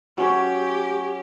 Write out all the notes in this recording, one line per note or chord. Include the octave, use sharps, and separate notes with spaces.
F#3 C#4 G4 C#5